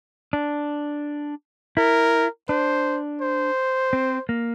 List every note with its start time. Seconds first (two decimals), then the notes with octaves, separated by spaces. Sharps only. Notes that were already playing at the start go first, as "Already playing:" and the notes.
0.33 D4
1.77 E4 A#4
2.49 D4 C5
3.21 C5
3.93 C4
4.29 A#3